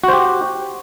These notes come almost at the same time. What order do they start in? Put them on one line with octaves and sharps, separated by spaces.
F#4 C5 G4